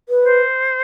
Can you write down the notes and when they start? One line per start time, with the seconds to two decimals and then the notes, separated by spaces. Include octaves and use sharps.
0.09 B4
0.24 C5